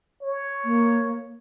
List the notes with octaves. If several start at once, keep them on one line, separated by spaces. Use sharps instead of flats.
C#5
A#3